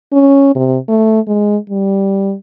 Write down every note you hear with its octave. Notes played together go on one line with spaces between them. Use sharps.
C#4
C3
A3
G#3
G3